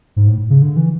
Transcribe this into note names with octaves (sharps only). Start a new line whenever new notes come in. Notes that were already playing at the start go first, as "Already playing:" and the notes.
G#2
A2
C#3
D3
E3